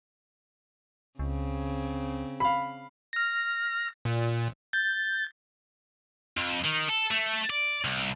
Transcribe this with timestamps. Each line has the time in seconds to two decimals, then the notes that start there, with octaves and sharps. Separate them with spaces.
1.19 C#2 C#3 C4
2.40 F5 B5
3.13 F6 A#6
4.05 A#2
4.73 G6 A6
6.37 F2
6.64 D#3
6.89 A4
7.11 A3
7.50 D5
7.84 C2